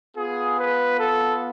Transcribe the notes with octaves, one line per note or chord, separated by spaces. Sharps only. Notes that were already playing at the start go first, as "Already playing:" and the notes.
B3 F4 G#4
B4
A4